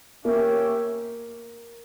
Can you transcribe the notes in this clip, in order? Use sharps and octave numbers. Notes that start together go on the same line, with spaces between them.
A#3 C#4 G4 C#5 E5